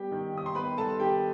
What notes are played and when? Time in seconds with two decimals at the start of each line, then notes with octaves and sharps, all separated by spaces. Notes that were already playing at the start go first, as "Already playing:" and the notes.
Already playing: G3 B3 G4 G5
0.12 D#3
0.33 D#2 D#6
0.46 C6
0.55 B3 B4 B5
0.78 G3 A4 A5
1.00 D#3 G4 G5